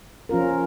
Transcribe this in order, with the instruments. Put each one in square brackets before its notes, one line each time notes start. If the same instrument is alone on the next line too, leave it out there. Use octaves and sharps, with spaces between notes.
[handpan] F3 C#4 F4 A#4